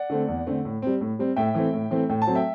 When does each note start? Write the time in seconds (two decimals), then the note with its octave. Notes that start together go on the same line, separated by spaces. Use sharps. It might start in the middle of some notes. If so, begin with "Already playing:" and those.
Already playing: D5 F#5
0.10 D3 A3 C4
0.28 E2
0.47 D3 A3 C4
0.65 A2
0.82 G3 C4
1.01 A2
1.19 G3 C4
1.36 A2 E5 G5
1.54 E3 A3 C4
1.73 A2
1.90 E3 A3 C4
2.09 A2 G5
2.22 A5
2.27 F#3 A3 C4
2.35 E5 G5